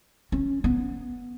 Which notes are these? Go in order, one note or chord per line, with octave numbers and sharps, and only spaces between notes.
C#4
B3